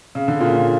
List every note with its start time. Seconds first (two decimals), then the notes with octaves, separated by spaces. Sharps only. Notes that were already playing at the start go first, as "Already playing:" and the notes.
0.15 C#3
0.28 D3
0.40 A#2 C#3